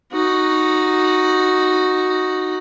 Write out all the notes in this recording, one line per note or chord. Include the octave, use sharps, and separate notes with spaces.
D#4 F#4